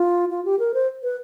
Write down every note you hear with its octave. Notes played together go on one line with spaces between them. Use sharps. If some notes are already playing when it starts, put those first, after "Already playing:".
Already playing: F4
F4
G4
A#4
C5
B4